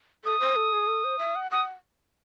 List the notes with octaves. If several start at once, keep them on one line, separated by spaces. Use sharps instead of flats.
A4 D#6
C5
A4
G#4
A4
C5
E5
F#5
F#5 D#6